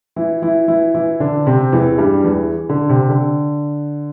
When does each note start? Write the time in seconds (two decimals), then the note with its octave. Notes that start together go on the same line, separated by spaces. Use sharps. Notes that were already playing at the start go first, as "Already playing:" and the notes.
0.16 E3 E4
0.42 E3 E4
0.68 E3 E4
0.94 E3 E4
1.20 D3 D4
1.46 C3 C4
1.72 E2 E3
1.98 G2 G3
2.24 E2 E3
2.69 D3
2.89 C3
3.09 D3